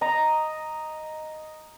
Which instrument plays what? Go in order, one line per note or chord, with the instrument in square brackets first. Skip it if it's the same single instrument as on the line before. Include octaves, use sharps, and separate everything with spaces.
[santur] D#5 A#5